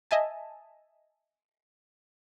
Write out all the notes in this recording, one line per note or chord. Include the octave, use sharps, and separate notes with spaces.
D#5 E5 G#5 A5